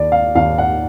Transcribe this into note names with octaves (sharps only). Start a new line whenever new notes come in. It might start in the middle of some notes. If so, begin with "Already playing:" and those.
Already playing: D#2 D5
F5
D#2 F5
F#5